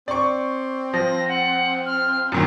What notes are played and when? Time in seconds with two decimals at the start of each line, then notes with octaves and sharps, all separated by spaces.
0.08 C4 D5 C#6
0.94 F3 A#6
1.28 F#5
1.86 F6
2.32 F#2 A#2 D#3 F#3